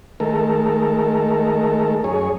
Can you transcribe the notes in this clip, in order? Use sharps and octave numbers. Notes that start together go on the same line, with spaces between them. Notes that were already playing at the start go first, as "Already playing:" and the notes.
D#3 G#3 A3 A4 A#4
F#2 G#4 C#5